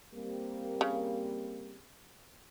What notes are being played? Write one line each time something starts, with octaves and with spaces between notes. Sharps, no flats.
G3 A#3 C4
C#3